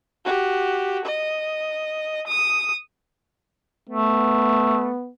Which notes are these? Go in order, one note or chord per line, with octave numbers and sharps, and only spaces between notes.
F#4 G4
D#5
D#6
A3 B3